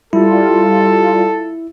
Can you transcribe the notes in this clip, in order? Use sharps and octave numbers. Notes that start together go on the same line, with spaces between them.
G3 E4 F4 A4